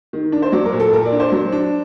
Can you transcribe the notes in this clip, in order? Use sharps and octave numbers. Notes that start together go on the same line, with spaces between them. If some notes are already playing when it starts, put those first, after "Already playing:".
D#3
D4
C5
F#3 D5
A#4
A#2
A4
A#2 A#4
D5
D4
C5
F#3
D4